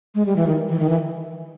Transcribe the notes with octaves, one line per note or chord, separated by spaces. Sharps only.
G#3
G3
E3
D#3
E3
D#3
E3